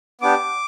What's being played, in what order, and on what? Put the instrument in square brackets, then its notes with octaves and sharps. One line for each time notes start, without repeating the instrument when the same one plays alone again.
[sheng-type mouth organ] B3 D4 G4 D6